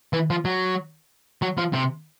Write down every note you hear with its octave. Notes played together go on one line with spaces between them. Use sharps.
E3
F3
F#3
F#3
F3
C3